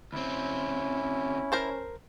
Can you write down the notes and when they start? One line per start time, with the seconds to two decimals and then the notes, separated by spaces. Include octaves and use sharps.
0.13 D2 C4 C#4 E4
1.52 A#4 C5 A5